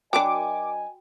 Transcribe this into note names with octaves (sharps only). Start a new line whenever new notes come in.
F#3 D4 F#4 A#4 D#5 G5 G#5 D6